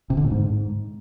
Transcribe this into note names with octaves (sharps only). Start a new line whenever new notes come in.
C3
D3
A2
G#2